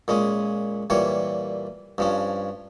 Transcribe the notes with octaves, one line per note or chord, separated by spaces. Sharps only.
A#2 G#3 C#4
A#2 E3 G3 C#5
G2 F3 C#4